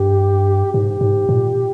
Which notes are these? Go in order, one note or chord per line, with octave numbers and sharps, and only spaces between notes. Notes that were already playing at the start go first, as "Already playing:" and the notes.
Already playing: G2 G4
G#2 G4
G#2
A#2